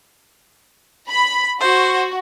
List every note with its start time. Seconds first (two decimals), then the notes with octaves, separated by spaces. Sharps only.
1.09 B5
1.60 F#4 C5